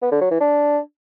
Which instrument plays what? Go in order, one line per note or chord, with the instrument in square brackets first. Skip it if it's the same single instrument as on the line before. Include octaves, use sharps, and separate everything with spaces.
[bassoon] B3
D3
F#3
E3
D4